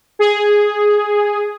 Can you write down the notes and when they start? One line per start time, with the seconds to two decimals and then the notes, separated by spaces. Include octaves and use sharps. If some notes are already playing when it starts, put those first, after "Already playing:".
0.19 G#4